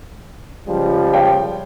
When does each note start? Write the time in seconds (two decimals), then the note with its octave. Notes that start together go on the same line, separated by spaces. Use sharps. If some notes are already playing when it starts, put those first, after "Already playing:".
0.68 C#2 F3 G3
1.13 C#5 F5 G5